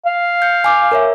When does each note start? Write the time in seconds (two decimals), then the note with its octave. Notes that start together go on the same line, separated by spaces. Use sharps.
0.06 F5
0.42 G6 C#7
0.64 G#5 D6 G6
0.92 A#4 C#5 E5